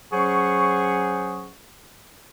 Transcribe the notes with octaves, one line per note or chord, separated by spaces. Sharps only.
F#3 C#4 G#4 C5 F#5 C#6